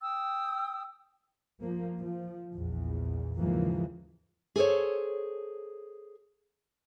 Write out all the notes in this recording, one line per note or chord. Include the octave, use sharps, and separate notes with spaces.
G5 D#6 E6
F3 A#3
F3
A#1 E2
D#2 G#2 C#3 E3 F3 A#3
G#4 A4 C5 C#5